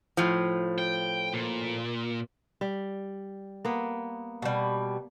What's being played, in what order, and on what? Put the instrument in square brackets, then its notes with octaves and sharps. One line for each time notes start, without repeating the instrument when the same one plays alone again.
[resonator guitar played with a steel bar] A2 F3
[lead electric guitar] G5
A#2
[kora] G3
A#3 B3
[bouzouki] B2 G3